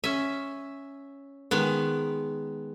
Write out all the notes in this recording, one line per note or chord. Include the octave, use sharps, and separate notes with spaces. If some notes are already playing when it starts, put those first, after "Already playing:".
C#4 E5
D#3 G#3 B3